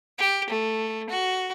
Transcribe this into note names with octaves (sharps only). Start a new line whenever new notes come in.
G4
A3
F#4